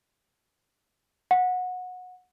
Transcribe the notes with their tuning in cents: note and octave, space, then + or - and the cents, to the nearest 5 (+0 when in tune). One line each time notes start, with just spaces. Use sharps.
F#5 -20